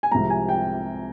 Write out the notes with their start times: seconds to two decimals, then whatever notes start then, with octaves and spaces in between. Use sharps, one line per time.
0.03 G#5
0.11 C2 C3 F3 G#3 A#5
0.30 G#5
0.49 G5